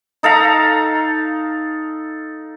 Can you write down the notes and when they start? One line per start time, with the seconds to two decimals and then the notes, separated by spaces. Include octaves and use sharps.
0.23 D#4 A4 F5 A#5